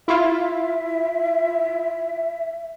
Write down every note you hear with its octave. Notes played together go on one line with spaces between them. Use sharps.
E4 F4 E5